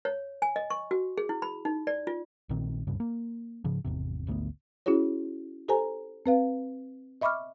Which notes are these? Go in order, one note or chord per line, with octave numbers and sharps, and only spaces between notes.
C#5
G#5
D#5
C#6
F#4
G#4
E4
B5
D#4
D5
F4
A#1 A#2 D#3 C4
D#1 C2 G2 C#3
A#3
G#2 C#3 F3
G#1 E2 C3
G#1 D2 A3 B3
C#4 E4 F#4 G#4 C#5
G4 A4 C5 G#5 A#5
C4 B4 F5
D#5 E5 B5 C#6 D6 F6